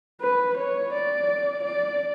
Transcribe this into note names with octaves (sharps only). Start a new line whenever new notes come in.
B4
C#5
D5
D5